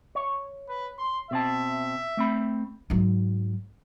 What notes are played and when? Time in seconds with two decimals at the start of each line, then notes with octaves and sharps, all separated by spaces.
0.15 C#5
0.69 B4
0.99 C6
1.31 B2 C4 E5 A5
2.17 A3 C4 B5
2.90 G#2 F#3